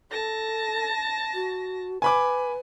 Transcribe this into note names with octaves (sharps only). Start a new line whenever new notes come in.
A4 A5 A#6
F#4
B4 G#5 B5 D6